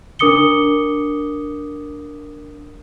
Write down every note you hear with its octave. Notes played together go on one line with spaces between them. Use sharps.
D4 A#4 D6 D#6 C#7 G7